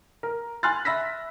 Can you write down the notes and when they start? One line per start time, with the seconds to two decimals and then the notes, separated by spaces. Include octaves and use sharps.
0.23 A#4
0.63 G#5 B5 C6 F6 F#6 A6
0.85 E5 B5 E6 A#6 B6